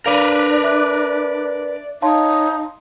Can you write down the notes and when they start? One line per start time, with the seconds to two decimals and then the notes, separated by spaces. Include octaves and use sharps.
0.06 D4 A#4 B4 D5 F5 D6
0.64 E5 D6 F#6
2.02 D#4 C#5 F5 A5 C6